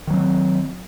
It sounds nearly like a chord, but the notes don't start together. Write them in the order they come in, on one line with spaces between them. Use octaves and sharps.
D#3 F#3 C4